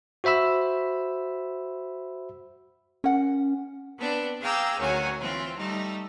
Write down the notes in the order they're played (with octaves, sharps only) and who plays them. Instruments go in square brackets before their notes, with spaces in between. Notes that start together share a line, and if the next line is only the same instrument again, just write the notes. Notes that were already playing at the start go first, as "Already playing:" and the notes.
[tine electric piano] F#4 C5 E5 B5 E6
[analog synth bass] C#4 [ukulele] A#4 F#5
[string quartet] B3 C4 D4 B4
G#4 F5 G5 A#5 D6 E6
D2 D#3 F#3 C#4 F#4 G#5
E3 C4 F4
G3 A3 D#4